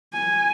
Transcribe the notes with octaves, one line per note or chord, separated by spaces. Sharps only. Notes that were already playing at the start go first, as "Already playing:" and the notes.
G#5